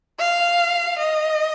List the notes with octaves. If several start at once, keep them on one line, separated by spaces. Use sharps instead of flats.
F5
D#5